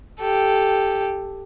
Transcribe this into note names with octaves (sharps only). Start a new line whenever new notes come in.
G4 A4